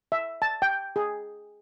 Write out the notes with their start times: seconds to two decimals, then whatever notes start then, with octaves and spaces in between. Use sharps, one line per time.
0.12 E5
0.42 A5
0.62 G5
0.96 G#4